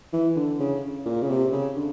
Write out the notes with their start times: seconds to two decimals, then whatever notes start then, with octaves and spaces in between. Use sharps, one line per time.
0.13 E3
0.36 D3
0.60 C#3
1.05 A#2
1.22 C#3
1.29 C3
1.52 C#3
1.76 D3